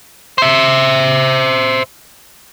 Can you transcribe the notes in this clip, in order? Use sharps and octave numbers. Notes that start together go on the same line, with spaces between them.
C5 E5